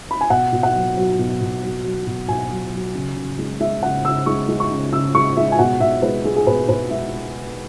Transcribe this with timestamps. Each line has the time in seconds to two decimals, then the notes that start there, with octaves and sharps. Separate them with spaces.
0.11 B5
0.21 G#5
0.30 B2 F#5
0.52 B2
0.63 F#5
0.75 F#3
0.97 F#3
1.19 B2
1.41 B2
1.63 F#3
1.85 F#3
2.07 B2
2.28 B2 G#5
2.51 F#3
2.73 F#3
2.95 C#3
3.17 C#3
3.39 G#3
3.60 G#3 E5
3.83 C#3 F#5
4.05 C#3 E6
4.26 G#3 C#6
4.49 G#3
4.60 C#6
4.71 C#3
4.93 C#3 E6
5.14 G#3 C#6
5.37 G#3 E5
5.52 G#5
5.59 B2 F#5
5.80 B2 E5
6.02 G#3 B4
6.25 G#3 G#4
6.36 G#4
6.47 B2 B4
6.68 B2 B4
6.90 G#3 E5